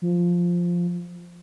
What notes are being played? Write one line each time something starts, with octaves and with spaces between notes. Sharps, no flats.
F3